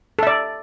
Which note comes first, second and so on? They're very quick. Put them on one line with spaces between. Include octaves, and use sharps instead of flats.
A4 E5 D5